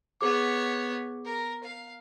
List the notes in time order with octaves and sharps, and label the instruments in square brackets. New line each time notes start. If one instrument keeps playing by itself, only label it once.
[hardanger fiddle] B3 C#5 [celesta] G#4 D6
[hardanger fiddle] A#4
F5